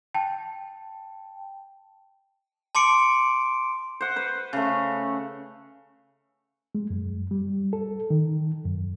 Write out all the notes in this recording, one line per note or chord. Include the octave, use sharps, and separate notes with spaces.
G5 A5
A5 C6 D6 C#7 D7
C5 F#5
B4 C5
C#3 A3
G#3
F#2
G3
A4
D#3
F#2